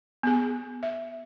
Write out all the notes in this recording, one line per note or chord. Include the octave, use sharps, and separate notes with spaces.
B3 G#4
E5